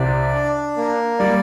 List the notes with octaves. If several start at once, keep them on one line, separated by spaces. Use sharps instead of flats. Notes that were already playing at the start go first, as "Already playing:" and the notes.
Already playing: C2 C3 D5
D4
A#3
G3 D5